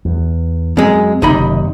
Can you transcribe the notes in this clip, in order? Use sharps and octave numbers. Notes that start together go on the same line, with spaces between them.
E2
F#2 G#3 C4
F#1 D#2 C3 D#4 B5